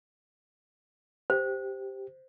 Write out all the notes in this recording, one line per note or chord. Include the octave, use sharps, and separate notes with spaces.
G4 C5